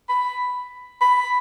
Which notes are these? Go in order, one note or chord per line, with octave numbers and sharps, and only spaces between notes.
B5
B5